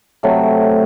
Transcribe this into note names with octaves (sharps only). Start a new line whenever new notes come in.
C3 F#3 A3